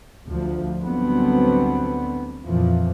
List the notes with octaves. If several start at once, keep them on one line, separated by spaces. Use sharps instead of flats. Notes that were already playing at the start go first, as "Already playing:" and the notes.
D2 F3
D2 D3 F#3 G3 B3 C4
F2 A#2 E3 F3